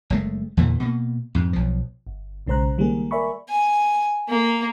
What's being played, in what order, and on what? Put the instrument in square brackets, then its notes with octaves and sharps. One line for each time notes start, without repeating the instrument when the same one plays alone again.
[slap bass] F#1 G#3 A3
E2 A#2 D3 E3
B2 A#3
F2 G#2
B1 F3
[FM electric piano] G1
B1 C#3 G#3 C5 A#5 F#6
D#3 G3 G#3 A#3 G#4
A#4 D5 E5 G#5 B5 C#6
[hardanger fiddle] G#5
A#3